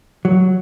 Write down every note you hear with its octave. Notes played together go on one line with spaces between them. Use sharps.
F#3